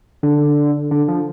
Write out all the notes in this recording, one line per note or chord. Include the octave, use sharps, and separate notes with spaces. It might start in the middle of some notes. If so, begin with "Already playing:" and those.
D3
D3
F3